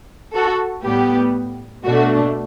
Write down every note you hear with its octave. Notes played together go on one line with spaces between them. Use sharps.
F#4 A4
A2 G3 B3 G4
B2 A3 D4 F#4